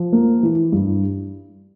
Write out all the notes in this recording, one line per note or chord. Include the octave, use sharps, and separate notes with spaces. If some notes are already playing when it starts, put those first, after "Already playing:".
Already playing: F3
A#3
E3
G2